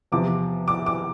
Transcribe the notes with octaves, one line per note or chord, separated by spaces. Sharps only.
E2 C3 F3 D6
D6
D6